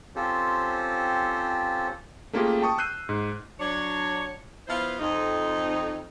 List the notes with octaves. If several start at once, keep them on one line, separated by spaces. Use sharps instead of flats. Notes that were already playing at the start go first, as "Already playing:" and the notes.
C4 C#4 F4 G4 A4 C5
A3 A#3 C#4 F4 G4 G#4
G5 A5 C#6 D#6
E6 F#6 G6 C7 D#7
G#2
F#3 D4 C#5
F3 B3 E4 B4 C5 F5
F2 D#4